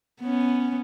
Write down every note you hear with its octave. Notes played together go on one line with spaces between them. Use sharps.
B3 C#4